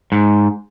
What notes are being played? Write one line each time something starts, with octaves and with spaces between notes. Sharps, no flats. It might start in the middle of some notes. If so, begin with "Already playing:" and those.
G#2